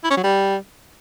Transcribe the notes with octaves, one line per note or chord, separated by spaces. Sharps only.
E4
C#4
F#3
G3